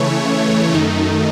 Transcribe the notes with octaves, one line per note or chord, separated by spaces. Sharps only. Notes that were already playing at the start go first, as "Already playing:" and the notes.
Already playing: C#3 E3 A3 C#5
F#2 D#3 A3 D#4